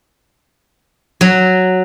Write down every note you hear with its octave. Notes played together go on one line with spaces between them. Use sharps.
F#3